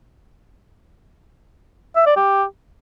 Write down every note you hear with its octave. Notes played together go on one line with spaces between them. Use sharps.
E5
D5
G4